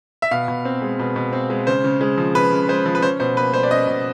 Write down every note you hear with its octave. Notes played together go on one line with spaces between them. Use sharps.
E5
B2 F5
B2
C4
G#3
B2
B2
C4
G#3
C#3 C5
C#3
G#3
F3
C#3 B4
C#3
G#3 C5
F3
B4
C#4 C5
B2 C5
A#3 B4
G3 C5
D5
C#4 D#5
B2